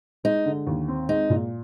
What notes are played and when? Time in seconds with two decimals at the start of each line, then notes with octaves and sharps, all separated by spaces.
0.24 G#3 D#4
0.45 D3
0.67 D#2
0.88 C4
1.09 G#3 D#4
1.30 A#2